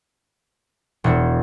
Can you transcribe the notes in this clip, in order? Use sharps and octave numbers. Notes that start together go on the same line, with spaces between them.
E1